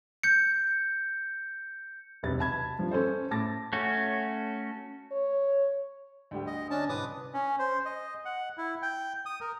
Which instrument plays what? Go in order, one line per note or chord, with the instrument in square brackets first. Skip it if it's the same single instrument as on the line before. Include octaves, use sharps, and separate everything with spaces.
[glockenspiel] G6 C#7
[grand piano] E1 B1 C3 B4 A6
A5 B5 G#6
G2 F3
C#4 A4 C5
A2 A5 D6 A6 A#6
[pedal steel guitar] A3 C#4 F#4
[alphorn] C#5
[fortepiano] D2 G3 G4
[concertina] D#5
C#4 D4 A5
[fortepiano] C2 [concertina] B4 D6 D#6
[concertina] C#4
C5
D#5
F#5
E4
G5
D#6
A#4